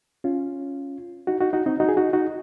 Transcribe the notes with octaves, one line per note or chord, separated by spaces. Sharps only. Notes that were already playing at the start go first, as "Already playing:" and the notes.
C#4 F4
D#4 F#4
D#4 F#4
D#4 F#4
C4 D#4
D#4 F#4
G#4
D#4 F#4
D#4 F#4